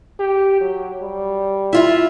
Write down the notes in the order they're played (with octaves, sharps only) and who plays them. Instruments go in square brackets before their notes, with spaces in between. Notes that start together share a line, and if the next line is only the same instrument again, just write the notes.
[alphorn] G4
F#3
G3
[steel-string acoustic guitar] E4 F4 E5